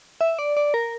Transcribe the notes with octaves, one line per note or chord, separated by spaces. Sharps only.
E5
D5
D5
A#4